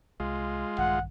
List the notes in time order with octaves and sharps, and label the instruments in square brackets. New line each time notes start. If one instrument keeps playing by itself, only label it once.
[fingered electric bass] C2 [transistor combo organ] G#3 F4
[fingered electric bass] A#1 G2 D#3 [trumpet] F#5